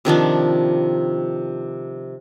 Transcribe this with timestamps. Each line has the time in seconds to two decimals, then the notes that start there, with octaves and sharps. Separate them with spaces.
0.05 C3 D#3 F3 D4